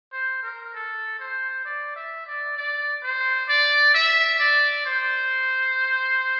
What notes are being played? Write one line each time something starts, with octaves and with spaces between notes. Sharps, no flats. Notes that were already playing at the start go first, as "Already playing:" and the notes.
C5
A#4
A4
C5
D5
E5
D5
D5
C5
D5
E5
D5
C5